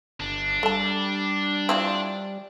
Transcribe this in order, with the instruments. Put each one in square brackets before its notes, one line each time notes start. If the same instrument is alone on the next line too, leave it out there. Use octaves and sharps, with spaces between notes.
[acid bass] G1 [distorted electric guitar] D4
[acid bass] G3 [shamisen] A4 A5
[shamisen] C4 E4 F4